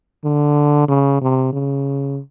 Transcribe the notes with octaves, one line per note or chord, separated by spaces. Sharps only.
D3
C#3
C3
C#3